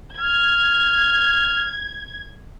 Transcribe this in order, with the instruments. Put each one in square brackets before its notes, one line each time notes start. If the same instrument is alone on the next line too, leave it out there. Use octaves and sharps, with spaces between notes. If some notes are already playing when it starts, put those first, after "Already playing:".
[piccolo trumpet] F6 [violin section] G#6